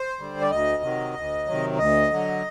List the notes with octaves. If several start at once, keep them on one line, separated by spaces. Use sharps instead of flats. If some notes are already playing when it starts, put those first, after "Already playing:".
Already playing: C5
D3 G3
D5
D2 D#5
C3 D#3 F#3
D2
C3 D#3 F#3
D2 D#5
D3 F#3